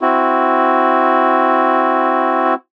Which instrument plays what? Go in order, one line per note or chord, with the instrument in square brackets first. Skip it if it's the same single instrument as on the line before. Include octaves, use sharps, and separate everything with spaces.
[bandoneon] C4 E4 F#4